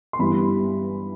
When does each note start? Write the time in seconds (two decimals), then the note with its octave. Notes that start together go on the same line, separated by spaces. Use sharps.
0.13 C6
0.19 G2 E3 G3 B3 B5